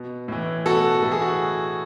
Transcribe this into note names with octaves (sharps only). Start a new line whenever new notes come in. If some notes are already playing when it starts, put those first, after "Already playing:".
Already playing: B2
A2 E3
B2 F#4 A4
A2 E3 A4
G#4
F#4